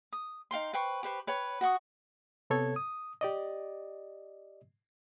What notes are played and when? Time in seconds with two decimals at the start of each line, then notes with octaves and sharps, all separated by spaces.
0.13 D#6
0.51 D#4 F5 G5 C6
0.73 B4 C5 G5 C#6
1.03 G4 B4 C5 C#6
1.27 B4 C#5 G5
1.61 F#4 F#5 C#6 D#6
2.50 C3 B3 A4 C#5 G#6
2.76 D#6
3.21 G4 D5 D#5